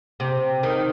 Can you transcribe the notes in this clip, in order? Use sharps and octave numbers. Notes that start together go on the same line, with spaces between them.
C3
D#3